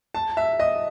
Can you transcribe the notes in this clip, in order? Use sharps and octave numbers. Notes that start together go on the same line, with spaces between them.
A5
E5
D#5